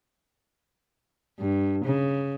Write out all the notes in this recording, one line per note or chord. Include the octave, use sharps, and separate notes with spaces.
G2
C#3